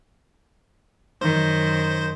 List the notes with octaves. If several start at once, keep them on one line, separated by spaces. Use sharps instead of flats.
F#2 D#3 C5